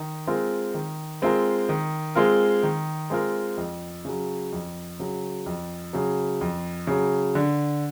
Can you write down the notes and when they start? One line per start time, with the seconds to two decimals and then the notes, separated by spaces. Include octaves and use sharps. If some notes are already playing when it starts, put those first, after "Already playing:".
Already playing: D#3
0.27 G#3 C4 F4 A#4
0.74 D#3
1.22 G#3 C4 F4 A#4
1.69 D#3
2.15 G#3 C4 F4 A#4
2.63 D#3
3.10 G#3 C4 F4 A#4
3.57 F2
4.05 C#3 F#3
4.52 F2
4.99 C#3 F#3
5.46 F2
5.93 C#3 F#3
6.41 F2
6.87 C#3 F#3
7.35 D3